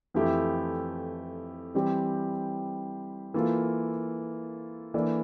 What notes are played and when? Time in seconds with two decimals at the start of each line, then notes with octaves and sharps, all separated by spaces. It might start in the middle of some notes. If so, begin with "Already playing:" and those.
0.14 F2 E3 A3 E4 G4
1.74 E3 G3 C4 G4
3.34 E3 A#3 F4 A4
4.94 E3 A#3 D4 A4 D5